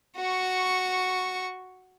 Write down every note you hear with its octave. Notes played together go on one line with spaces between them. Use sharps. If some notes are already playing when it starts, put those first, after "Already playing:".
F#4 C#6